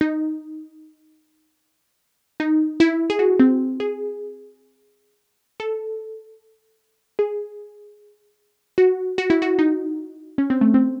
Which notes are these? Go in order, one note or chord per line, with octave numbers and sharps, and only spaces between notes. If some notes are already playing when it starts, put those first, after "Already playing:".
D#4
D#4
E4
G#4
F#4
C4
G#4
A4
G#4
F#4
F#4
E4
F#4
D#4
C#4
C4
A3
C4